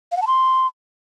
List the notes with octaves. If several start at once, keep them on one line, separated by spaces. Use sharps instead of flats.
F5
F#5
A5
C6